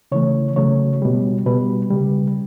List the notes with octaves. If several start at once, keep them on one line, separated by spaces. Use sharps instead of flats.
C#3 E3 A3 C#5
C#3 F#3 A3 C#5
B2 G3
B2 G3 B4
C#3 G3